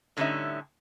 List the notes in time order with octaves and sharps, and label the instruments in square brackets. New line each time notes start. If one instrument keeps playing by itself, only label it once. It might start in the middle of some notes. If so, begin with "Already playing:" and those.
[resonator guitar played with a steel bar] A2 D3 G3 C#4 D#4 E5